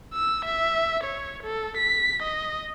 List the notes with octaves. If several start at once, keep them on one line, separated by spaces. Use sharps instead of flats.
E6
E5
C#5
A4
B6
D#5